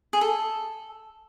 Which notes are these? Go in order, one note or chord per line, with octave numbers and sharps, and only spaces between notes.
G#4
A4